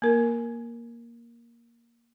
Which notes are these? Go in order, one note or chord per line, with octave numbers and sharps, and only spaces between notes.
A#3 A#4